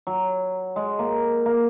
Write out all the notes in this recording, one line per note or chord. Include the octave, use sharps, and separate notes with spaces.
F#3
G#3
A#3
A#3